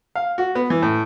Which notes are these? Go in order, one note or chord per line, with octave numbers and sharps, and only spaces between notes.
F5
F#4
B3
E3
A2